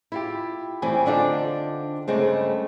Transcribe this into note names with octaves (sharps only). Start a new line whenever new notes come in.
E4 F4 G4
A2 E3 G3 C4 G4 G#5
D3 C4 D4 D#4 F4 A4
G2 C#3 G#3 A3 C4